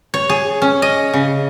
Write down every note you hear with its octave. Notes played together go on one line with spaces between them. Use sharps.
C#5
G#4
C#4
D#5
C#3